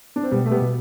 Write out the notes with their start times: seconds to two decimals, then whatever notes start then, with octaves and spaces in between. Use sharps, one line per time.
0.16 D4
0.23 C4
0.31 B2 G3 B3
0.46 A3
0.51 G3 B3
0.61 B2